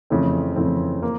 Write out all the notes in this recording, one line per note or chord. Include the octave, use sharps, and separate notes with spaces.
F2 C#3 E3 A3 C4
F2 C#3 E3 A3 C4
A#3